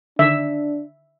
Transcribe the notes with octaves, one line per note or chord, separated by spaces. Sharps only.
D3 D#3 D4 E5